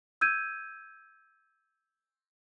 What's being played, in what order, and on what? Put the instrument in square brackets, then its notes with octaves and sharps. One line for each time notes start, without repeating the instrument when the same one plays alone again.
[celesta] E6 G6 G#6 D#7